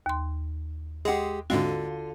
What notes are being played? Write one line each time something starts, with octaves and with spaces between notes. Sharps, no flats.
D#2 C6
G#3 G4 G#4 F#5
G#2 D3 G#3 C4 F4 F#4